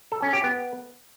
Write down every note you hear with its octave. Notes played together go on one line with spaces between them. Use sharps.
A4
C#4
G4
B3